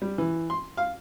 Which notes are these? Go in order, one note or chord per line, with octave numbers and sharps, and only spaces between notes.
G3
E3
C6
F5